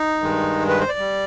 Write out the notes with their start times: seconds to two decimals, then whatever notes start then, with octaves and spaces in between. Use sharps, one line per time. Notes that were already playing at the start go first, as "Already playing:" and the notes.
Already playing: D#4
0.21 G2 D#3 G#3
0.69 B4
0.80 C5
0.89 D5
0.98 G3